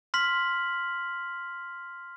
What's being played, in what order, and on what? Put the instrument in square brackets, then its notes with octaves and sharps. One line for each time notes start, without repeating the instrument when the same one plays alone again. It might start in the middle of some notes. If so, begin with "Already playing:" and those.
[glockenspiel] C6 F6 B6 F#7